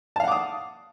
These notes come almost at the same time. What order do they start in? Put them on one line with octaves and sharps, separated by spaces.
A5 F5 F#5 D6 D#6